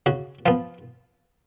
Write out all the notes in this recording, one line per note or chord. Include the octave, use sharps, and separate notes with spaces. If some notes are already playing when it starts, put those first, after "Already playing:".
C#3 F#4
F3 B3 F4